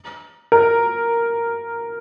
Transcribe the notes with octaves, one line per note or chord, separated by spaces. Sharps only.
A#4